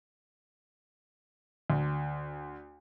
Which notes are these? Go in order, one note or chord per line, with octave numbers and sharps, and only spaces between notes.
D2